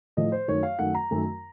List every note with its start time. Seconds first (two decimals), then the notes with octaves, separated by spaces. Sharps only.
0.17 A2 F3 A3 D#5
0.32 C5
0.48 F#2 D#3 A3 C#5
0.63 F5
0.79 F#2 D#3 A3 F#5
0.95 A#5
1.11 F#2 D#3 A3